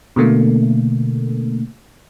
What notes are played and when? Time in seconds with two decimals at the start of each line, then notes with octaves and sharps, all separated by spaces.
0.16 B2 D3 A3 A#3